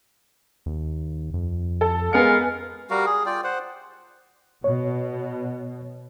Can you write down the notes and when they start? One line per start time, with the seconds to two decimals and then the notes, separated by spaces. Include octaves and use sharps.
0.66 D#2
1.34 F2
1.81 A4
2.13 G#3 B3 A#4 F5 G#5 C#7
2.90 G3 F#4 A#4 F5
3.06 G#4
3.26 F4 D5 G5
3.44 C5 F#5
4.64 B2 C#5